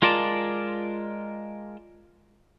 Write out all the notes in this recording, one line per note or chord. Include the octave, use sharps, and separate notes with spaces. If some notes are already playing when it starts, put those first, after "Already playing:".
G#3 F4 A#4 D5 A5